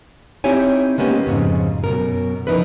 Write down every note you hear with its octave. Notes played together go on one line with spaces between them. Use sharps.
C4 D#4 E4 G4 C#5 G#5
G#3 A#3 B3 C#4 G4
F2 G#2 C#3
F#2 B2 A#4
C#3 F3 D#4 E4 A#4 B4